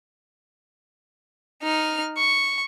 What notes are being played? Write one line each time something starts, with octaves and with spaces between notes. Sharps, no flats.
D#4 F6
C#6